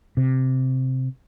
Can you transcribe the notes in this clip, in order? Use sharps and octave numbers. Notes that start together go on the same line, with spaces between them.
C3